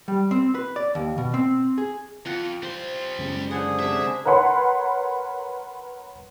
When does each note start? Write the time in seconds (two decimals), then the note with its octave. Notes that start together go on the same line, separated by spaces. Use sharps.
0.08 G3
0.31 C4
0.55 B4
0.76 D5
0.95 D#2
1.18 B2
1.34 C4
1.78 G#4
2.26 F2 F4 F#5
2.63 G3 C5 C6
3.19 F#2 C#3 G#3
3.51 D3 G#4 C5 C#5 F#5
3.79 C3 D4 E5
4.25 A#4 B4 C#5 F#5 B5 C6